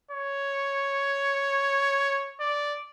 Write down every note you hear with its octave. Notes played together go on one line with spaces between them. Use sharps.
C#5
D5